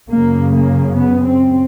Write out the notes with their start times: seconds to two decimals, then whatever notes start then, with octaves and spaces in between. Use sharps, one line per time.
0.10 F#2 C#3 A#3
0.53 A#3
0.96 B3
1.25 C4